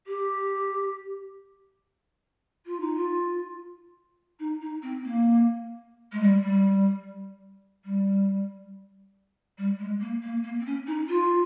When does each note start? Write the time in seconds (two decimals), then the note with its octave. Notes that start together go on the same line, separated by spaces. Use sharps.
0.07 G4
2.66 F4
2.80 D#4
2.95 F4
4.39 D#4
4.61 D#4
4.82 C4
5.04 A#3
6.12 G#3
6.22 G3
6.44 G3
7.85 G3
9.58 G3
9.78 G#3
10.00 A#3
10.22 A#3
10.43 A#3
10.60 C4
10.65 C#4
10.87 D#4
11.08 F4